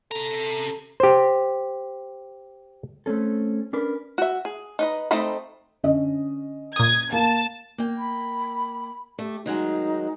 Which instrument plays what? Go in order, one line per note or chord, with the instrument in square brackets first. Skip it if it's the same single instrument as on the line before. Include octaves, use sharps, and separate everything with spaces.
[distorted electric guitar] C3 A#5 [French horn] A4
[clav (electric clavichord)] G4 C5
[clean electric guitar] A3 C4 C#4 A4
C#4 D4 A#4 B4
[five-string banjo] F#4 E5
G#4
D#4 B4 D#5
A3 C4 D#4 D#5 B5
[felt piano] D3 C#4 D#5
[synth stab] A#2 D#6 [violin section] G#6
[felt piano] A#3 [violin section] A5
[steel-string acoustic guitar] A#3 G5
[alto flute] B5
[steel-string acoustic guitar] A3 [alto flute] G4
[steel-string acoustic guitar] D#3 F#3 G#3 [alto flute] D#4